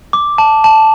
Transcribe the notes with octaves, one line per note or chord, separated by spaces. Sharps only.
D6
A5
A5